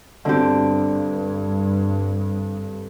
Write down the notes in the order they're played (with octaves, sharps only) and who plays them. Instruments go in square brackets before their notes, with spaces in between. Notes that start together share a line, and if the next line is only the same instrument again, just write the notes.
[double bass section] G2 [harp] D3 C4 G4